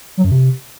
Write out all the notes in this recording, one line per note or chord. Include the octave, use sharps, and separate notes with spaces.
F#3
F#2
C3